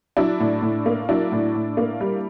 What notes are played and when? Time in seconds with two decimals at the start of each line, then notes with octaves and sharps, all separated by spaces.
0.17 F#3 D4 E4
0.40 A2
0.62 A2
0.86 A#3
1.09 F#3 D4 E4
1.32 A2
1.55 A2
1.77 A#3
2.00 G3